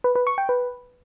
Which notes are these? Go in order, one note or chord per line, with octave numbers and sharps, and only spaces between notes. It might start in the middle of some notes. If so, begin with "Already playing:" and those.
B4
B4
C#6
G5
B4